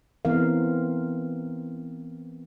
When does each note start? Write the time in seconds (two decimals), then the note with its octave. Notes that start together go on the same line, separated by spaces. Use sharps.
0.25 E3 B3 C4 A#4 F5